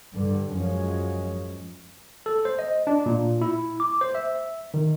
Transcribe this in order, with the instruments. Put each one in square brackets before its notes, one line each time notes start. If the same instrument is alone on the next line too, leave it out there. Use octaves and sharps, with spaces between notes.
[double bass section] G2 D3
F#2 F3 G#3 C#4
[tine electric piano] A4
C5
D#5
D4
A#2
E4
D6
C5
E5
D#3